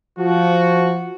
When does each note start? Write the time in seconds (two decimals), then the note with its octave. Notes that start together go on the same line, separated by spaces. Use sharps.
0.18 F3 F#4